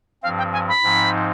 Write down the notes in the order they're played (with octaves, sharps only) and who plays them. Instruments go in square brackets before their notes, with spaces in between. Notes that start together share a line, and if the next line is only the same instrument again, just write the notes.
[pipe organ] G2 F3 C4 [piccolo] F5
[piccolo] G5
G#5
B5
[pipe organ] G#2 F3 C4 D#4